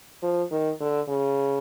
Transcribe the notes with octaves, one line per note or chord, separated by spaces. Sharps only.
F3
D#3
D3
C#3